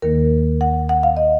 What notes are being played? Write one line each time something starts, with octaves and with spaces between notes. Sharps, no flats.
D#2 D#3 A#3 A#4
F#5
F#5
F5
D#5